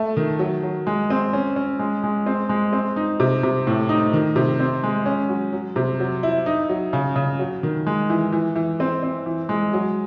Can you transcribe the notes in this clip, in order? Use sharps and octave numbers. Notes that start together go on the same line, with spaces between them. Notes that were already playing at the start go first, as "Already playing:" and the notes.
Already playing: A3
D#3
F#3
F#3
G#3
C4
C#4
C#4
G#3
G#3
C4
G#3
C4
D#4
C3
C3
A2
D#4
D#3
C3
C4
G#3
C#4
F#3
F#3
C3
F#3
E4
D#4
F#3
C#3
C#3
F#3
D#3
G#3
E3
E3
E3
C4
C4
E3
G#3
F#3